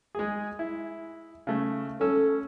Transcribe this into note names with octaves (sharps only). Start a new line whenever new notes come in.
G#3 G#4
E4
C#3 A3
C#4 A4 E6